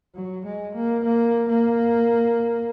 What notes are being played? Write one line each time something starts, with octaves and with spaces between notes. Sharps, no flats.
F#3
G#3
A#3
A#3
A#3